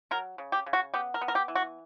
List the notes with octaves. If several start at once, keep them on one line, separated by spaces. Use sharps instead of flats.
F#3 A#4
C#3
G4
C#3
F#4
B3 G4
A#4
B3
A#4
G4
E3
F#4